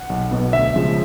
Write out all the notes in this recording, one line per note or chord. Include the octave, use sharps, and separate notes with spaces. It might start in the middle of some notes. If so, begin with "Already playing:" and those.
Already playing: F#5
B1
B2 F#3 B3
D2 E5
C#3 F3 G#3